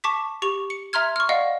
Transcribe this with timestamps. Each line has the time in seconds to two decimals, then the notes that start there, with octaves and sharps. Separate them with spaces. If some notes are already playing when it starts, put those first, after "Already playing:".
0.04 A5 C#6 D6 B6
0.42 G4 C#6 F7
0.70 C#7
0.93 E5 A#5 C6 F6 G#6
1.16 C#6 F6
1.29 D5 D#5 F5 F#5